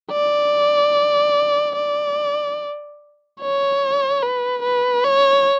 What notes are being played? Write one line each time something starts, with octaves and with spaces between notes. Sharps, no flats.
D5
D5
C#5
B4
B4
C#5